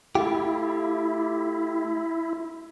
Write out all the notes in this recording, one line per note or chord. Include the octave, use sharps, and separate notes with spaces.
A3 E4 F4 G4